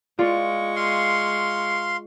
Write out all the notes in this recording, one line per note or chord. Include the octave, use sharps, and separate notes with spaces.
G#3 F4 D5 C#6
F5 C6